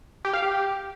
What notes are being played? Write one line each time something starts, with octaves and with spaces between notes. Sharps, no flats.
G4
F5
G4